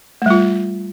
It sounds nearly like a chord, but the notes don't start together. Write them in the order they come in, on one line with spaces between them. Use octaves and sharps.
A3 G3 F4